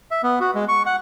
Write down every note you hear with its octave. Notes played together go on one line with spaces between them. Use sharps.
E5
B3
F#4
G#3
C#6
F#5